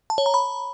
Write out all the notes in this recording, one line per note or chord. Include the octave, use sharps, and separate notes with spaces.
A5
C#5
A#5
B5